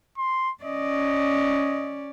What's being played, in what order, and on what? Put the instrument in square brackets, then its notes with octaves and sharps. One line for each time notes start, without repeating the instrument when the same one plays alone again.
[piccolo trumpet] C6
[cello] C#4 D5 [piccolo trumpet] D#5